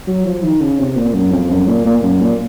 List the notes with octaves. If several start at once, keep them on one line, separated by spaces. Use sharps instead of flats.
F#3
F3
D#3
C#3
C3
A#2
F#2
F2
F#2
A#2
A#2
F#2
A#2